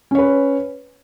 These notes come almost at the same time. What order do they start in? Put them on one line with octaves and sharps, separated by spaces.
C#4 C#5 B4